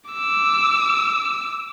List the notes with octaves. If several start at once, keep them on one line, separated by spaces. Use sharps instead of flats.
D6 E6